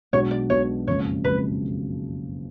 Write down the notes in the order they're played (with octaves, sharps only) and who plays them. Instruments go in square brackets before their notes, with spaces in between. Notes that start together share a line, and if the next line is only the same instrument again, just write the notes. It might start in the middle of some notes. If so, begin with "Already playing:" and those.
[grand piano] B1 B2 G#3 D4 F#4 [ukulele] C#5
[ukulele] D5
[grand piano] B1 B2 G#3 D4 F#4 [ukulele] C#5
[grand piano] F#1 F2 C#3 G#3 [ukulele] C#5
[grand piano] F#1 F2 C#3 G#3 [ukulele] B4